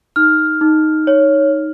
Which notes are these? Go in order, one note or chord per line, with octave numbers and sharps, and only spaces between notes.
D#4 F6
D#4
C#5